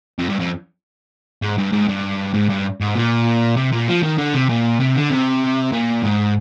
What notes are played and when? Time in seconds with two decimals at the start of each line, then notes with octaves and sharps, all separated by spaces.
0.19 F2
0.29 G2
0.40 F2
1.42 G#2
1.58 G2
1.72 G#2
1.88 G2
2.34 G#2
2.50 G2
2.81 G#2
2.96 A#2
3.57 C3
3.72 A#2
3.88 F3
4.03 D#3
4.18 D3
4.34 C3
4.49 A#2
4.80 C3
4.96 D3
5.10 C3
5.72 A#2
6.02 G#2